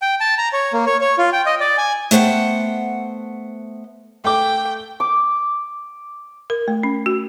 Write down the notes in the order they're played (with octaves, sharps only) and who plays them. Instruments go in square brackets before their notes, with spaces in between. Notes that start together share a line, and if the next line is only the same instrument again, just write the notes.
[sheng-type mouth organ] G5
A5
A#5
C#5
A#3
C#5
C#5
F4
G5
D#5
D5
G#5
[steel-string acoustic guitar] A3 B3 C5 F#5 G5
[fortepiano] A3 D6 [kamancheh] G5
[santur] D6
[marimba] A#4
A3
C#4
F#4